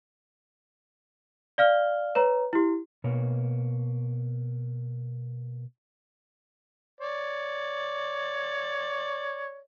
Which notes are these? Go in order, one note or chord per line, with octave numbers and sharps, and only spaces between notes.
D5 F5 F6 G7
B4 C#5 A#5
E4 G4
B2 A#3 C#5
C#5 D5